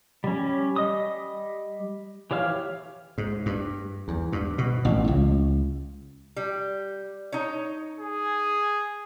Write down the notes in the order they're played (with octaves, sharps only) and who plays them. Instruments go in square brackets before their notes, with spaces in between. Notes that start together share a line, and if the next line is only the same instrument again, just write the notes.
[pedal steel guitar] G3 C#4
G3 D#5 D#6
E3 G4 C#5 F5 F6
[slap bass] G#2
G2
E2
G2
B2
A1
C#2
[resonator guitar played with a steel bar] G3
D#4 C#5
[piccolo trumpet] G#4